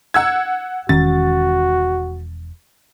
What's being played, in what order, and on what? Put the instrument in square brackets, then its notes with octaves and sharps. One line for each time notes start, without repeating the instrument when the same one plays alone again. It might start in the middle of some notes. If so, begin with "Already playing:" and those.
[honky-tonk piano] F#5 E6 G#6
[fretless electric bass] E1 D#3 C#4 [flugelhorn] F#4 [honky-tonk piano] A6